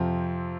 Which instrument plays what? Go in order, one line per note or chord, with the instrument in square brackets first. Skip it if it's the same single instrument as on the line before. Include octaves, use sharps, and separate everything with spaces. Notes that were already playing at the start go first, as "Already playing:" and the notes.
Already playing: [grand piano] F2 C3 F3 C4